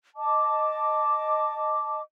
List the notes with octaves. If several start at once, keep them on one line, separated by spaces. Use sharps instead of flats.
D#5 A5 D6